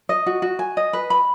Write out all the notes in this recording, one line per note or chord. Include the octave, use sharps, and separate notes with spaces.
D#5
F#4
F#4
G#5
D#5
B4
B5